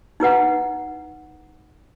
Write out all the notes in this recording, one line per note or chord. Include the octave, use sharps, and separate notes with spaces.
D#4 E4 B4 F#5